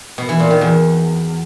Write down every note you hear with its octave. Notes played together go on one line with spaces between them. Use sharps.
B2
E3
A#2
D#3
E2